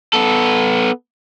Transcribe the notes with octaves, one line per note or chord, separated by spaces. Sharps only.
B3 A4